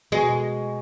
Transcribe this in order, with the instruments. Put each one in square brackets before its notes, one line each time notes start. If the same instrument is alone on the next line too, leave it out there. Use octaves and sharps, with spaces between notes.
[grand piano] B2 [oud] G#3